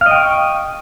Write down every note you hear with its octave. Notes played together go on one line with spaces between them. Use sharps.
D#5 F5 G5 C#6